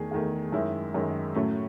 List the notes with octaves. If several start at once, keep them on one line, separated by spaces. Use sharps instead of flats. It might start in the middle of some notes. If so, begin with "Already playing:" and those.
Already playing: E2 D#3 A3 G#4
E2 D#3 A3
F#2 D#3 G#3 E4
F#2 D#3 G#3
A2 F#3 A3 C#4